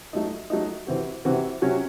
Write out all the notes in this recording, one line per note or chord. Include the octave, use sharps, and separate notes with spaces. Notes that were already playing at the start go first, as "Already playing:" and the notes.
F#3 A3 D#4
F#3 A3 D#4
C3 E3 C4 F#4
C3 E3 C4 F#4
C3 F#3 C#4 F#4